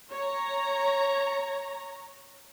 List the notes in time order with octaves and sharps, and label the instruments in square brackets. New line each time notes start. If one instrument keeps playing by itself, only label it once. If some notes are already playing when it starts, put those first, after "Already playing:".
[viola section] C#5 A#5